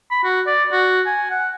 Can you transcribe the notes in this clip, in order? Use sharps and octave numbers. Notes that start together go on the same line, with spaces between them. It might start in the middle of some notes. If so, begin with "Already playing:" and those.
B5
F#4
D5
F#4
G#5
F#5